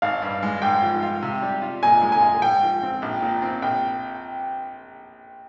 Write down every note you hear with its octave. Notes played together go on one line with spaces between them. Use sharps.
G#1 F5
G2
G#3
G#2 G5
F3
F4
C3
G3
F4
A#2 G#5
G#3
G#5
F4
G#2 G5
F3
C4
A#1
A#2
C4
A#1 G5